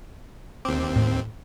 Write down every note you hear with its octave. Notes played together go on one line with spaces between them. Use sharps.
D#2 C4 D6
A2